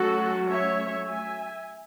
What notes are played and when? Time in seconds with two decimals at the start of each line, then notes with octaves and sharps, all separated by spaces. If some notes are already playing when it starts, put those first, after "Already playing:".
Already playing: F#3 A3 C#4 F#4 A4
0.49 C#5 E5
1.08 E5 G#5